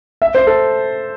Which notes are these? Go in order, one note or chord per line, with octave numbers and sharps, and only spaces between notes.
E5
C5
A4